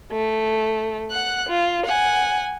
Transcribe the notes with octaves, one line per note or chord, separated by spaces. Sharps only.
A3
F#5 F#6
F4
F#5 G#5